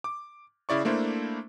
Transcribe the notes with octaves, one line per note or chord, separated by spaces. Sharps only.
D6
C#3 E4 D5 C#6
A3 A#3 D4 E4 C5